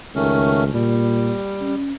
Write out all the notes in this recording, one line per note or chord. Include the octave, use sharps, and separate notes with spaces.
C#2 D#3 A3 C#4
A#2 G3
C#4